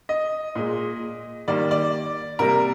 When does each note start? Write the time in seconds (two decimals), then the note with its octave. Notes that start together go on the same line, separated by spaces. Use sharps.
0.09 D#5
0.55 A#2 G#3
1.48 D#3 G3 A#3 D5
1.71 D5
2.39 C3 G3 A#3 A#4